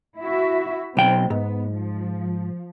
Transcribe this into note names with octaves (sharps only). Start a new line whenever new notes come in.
E4 F#4 E5
B1 C4 G5
G#2 B3
F3